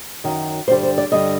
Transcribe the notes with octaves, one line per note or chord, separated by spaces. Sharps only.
F#2 D#3 F#3
G2 D3 G3 C5
C5
D5
G2 D3 G3 D#5